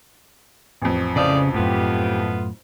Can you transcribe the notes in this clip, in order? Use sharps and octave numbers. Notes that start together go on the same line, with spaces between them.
A1 F2
A2 C#3 F3 D5 D#6
F#2 A2 A3 B3 F4 G4